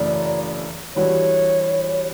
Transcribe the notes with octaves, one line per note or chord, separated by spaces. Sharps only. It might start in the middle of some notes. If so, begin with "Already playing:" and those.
Already playing: F#2 C#3 E3 A3 D4 D5
E3 G3 D4 F#4 C#5